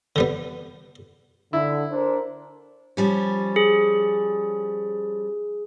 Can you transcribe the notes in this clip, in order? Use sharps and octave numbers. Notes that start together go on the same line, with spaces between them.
D3 G3 B3
D3 E4
D4 A#4 C5
F3 G3 C#4
G#4